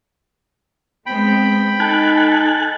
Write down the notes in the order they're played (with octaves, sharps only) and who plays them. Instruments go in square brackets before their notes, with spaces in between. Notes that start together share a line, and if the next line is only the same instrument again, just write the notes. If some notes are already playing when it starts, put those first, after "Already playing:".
[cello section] G#3 B3 C4 [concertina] G5 B5
[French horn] D#4 [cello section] A4 [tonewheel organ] G#5 A5 F#6